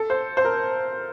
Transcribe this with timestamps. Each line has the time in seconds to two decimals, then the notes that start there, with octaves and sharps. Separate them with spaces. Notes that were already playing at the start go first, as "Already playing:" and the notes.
Already playing: A4
0.10 C5
0.37 C5
0.45 A#4